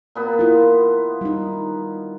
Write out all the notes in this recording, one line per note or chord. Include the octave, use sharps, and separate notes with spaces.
A#2 B3 B5
E4 F4
G3 D#4